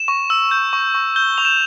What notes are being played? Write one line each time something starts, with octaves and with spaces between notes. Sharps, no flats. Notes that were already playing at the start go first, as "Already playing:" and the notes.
Already playing: E7
C#6
E6
G6
C#6
C#6
G6 G7
C#6 F7
E7